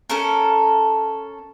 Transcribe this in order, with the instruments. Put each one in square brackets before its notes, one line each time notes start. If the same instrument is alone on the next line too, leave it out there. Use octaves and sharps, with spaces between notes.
[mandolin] C#4 A4 A#4